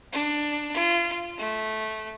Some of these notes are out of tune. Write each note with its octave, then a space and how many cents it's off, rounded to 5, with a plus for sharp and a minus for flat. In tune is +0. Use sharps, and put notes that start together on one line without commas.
D4 +10
F4 -30
A3 -15